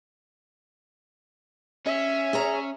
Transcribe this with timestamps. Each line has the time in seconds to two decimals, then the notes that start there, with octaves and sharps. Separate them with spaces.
1.86 C#4 E5
2.33 G#4 C#5 A#5